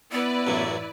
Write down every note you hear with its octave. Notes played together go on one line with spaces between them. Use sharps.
B3 E4 B4 D5
A1 F#2 F#3